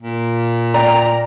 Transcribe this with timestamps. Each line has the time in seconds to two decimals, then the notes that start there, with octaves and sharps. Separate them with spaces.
0.03 A#2
0.74 D5 G5 A#5